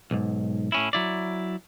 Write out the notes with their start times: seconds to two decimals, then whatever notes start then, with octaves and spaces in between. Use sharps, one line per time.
0.11 B1 G#2
0.72 A2 C#4 E4
0.93 F#3 E4 D5